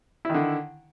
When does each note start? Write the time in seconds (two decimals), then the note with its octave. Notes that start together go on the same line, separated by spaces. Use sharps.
0.25 E4
0.30 D#3
0.34 D3